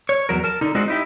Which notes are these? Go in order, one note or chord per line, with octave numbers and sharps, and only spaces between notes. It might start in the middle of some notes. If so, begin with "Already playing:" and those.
C#5
E2 C3 F#3 A#4
A#4 A5
D3 D#4
G#3 C4 D4 D#4 F4 F#4
D#4 E4 G4